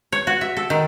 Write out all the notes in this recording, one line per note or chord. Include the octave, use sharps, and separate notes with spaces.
C#5
F#4
E5
A4
D#3